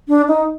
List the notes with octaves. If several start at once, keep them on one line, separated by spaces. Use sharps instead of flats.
D4
D#4